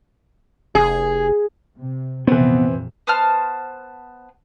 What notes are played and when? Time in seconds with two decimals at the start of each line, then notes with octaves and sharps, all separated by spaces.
0.75 F1 G#4
1.77 C3
2.27 A#1 F2 C3 E3 B3 C4
3.07 B3 C5 A5 F6